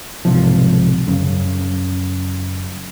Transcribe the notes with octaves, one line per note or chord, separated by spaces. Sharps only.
B1 G#2 C3 F3
F#2 C#3